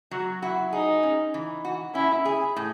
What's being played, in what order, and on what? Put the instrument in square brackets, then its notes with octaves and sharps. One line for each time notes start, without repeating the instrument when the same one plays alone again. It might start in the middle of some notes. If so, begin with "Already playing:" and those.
[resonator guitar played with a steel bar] F#3 [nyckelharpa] F#4
[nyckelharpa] E4 [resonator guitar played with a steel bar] F#4
[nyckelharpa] D#4 [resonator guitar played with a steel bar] G#4
[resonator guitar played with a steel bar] C#4
E3
F#4
[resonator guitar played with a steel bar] C#4 [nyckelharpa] E4
[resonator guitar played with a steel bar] G#4
A2